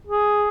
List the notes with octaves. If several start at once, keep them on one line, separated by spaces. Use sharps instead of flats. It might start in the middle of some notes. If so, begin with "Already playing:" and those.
G#4